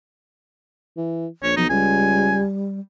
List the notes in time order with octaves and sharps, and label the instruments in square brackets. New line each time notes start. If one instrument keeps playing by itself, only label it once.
[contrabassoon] E3
[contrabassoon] A#1 [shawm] C#5
[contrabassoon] B1 [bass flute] F3 [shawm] D#4
[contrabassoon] C#2 [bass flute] G3 [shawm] G#5